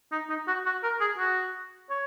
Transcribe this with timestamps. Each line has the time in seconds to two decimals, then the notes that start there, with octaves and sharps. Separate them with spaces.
0.12 D#4
0.29 D#4
0.48 F#4
0.66 F#4
0.83 A#4
1.01 G#4
1.18 F#4
1.90 C#5